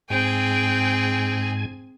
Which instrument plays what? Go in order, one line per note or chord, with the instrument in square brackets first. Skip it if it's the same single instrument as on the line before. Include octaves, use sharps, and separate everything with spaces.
[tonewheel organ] G#2 G#5 [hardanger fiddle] C4 G#4 [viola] G5